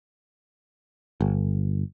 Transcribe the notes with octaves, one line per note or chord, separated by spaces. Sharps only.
G1